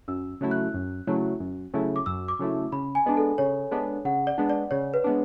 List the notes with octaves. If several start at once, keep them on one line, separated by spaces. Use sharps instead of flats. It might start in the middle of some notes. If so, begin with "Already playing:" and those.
F#2 E6
C#3 F#3 A3 E4
F#6
F#2
C#3 F#3 A3 E4
F#2
C#3 F#3 A3 E4
D6
F#2 E6
D6
C#3 F#3 A3 E4
C#3 B5
G#5
G#3 B3 D4
A4
C#3 C#5
G#3 B3 D4
C#3 F#5
D5
G#3 B3 D4
D5
C#3 C#5
B4
G#3 B3 D4